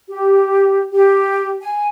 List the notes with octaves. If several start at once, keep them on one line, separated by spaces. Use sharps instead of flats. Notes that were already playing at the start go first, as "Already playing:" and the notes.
G4
G4
G#5